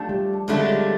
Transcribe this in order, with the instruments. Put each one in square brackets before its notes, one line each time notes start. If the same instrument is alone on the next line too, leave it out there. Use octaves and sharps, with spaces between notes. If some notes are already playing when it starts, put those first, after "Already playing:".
Already playing: [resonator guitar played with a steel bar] F3 A3 D4 G4
[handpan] G3
[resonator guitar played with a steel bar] F2 D3 F#3 A3 D4 [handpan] G#3
[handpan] G3